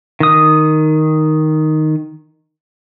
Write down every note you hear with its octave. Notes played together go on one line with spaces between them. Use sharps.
D#3 D#6